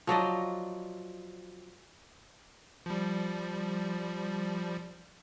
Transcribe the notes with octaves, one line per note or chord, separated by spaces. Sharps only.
F3 F#3 D5 D#5
F3 G3